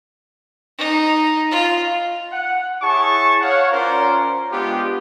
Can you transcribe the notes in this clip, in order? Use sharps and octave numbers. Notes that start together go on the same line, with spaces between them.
D#4
F4
F#5
E4 G#4 C#5 A5 C#6
C#5 F5 F#5
C#4 F4 A#4 C5 D5 A#5
G#3 B3 D4 F4 G4